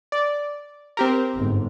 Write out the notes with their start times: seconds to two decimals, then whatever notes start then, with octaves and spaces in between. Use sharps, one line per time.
0.12 D5
0.97 C4 G4 A#4
1.35 G1 G#2